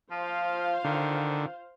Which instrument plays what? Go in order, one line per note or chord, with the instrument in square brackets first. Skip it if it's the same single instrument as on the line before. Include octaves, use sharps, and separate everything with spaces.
[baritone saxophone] F3 [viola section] F4 C5 F5
[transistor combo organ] D3 [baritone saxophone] D#3